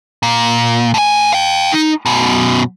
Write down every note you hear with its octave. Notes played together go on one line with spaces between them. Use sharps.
A#2
A2 G#5
F5 G5
D#4
F#2 B2